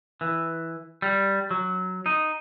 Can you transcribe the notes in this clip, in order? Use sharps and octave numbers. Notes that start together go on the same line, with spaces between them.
E3
G3
F#3
D#4